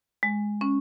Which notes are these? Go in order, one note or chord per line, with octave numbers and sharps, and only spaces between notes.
G#3
C#4